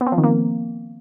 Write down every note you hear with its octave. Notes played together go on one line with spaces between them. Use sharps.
B3
C4
F3
D#3
A#3